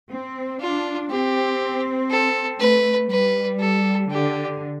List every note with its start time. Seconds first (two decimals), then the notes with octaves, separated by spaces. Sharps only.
0.10 C4
0.61 D4 F4
1.10 C4 G4
2.10 A4
2.60 A3 B4
3.10 G3 B4
3.60 A4
4.10 D3 G4